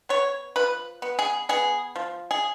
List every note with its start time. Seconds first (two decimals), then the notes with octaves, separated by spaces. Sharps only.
0.09 B3 C#5
0.56 F3 B4
1.02 B3
1.19 G#4
1.49 B3 G#4
1.96 F3
2.31 G#4